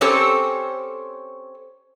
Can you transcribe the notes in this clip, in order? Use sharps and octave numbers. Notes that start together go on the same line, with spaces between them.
C4 C#4 G4 A4 C5 C#5